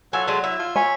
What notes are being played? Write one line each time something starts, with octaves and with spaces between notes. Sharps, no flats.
F#3 F4 F#4 A4 E5 G#5
G#3 A3 D4 A5
E4 E5
F4
C#5 G#5 B5 C#6